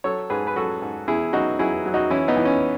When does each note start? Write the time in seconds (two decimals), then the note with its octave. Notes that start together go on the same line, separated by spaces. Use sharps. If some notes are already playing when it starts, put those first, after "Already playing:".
0.04 F#3 A4 C#5
0.30 G#2 G#4 B4
0.47 B4
0.56 F#3 F#4 A4
0.82 G#2
1.08 E2 E4 G#4
1.33 F#3 D#4 F#4
1.59 F#3 E4 G#4
1.86 F#3
1.94 D#4 F#4
2.10 E3 C#4 E4
2.28 B3 D#4
2.37 E3
2.45 C#4